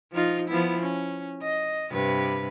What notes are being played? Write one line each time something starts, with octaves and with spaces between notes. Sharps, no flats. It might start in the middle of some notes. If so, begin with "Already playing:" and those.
F3 D#4 F4
F3 B3 E4
C#4
D#5
G2 C3 B4